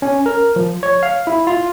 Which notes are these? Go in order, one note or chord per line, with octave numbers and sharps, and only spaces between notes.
C#4
A#4
F3
C#5
F5
E4
F4